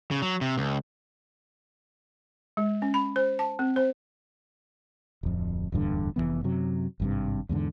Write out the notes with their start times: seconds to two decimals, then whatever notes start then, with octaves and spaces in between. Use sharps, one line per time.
0.11 C#3
0.22 F#3
0.41 C3
0.58 C#2
2.57 G#3
2.82 C#4
2.94 B5
3.16 C5
3.39 A5
3.59 C4
3.76 C5
5.23 D1 F2
5.72 D1 E2 G2 D3
6.16 F1 F#2 E3 B3
6.44 F#2 C3 F#3
7.00 G#1 G2 C3
7.49 E2 G#2 B2 D3